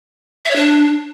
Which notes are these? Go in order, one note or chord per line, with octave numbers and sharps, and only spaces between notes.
E5
C#5
D4